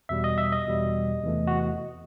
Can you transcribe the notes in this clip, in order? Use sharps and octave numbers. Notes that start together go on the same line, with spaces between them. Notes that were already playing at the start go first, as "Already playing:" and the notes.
E2 B2 G3 E5
D#5
E5
D#5
E2 B2 G3
E2 C3 E3 A3
F#4